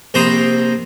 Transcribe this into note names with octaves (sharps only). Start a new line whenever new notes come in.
A#1 C3 C5 A#5 B5 D#6